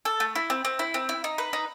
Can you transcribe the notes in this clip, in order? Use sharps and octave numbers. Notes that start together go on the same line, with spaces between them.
A4
A3
E4
C4
C4
E4
C4
E4
D#4
B4
D#4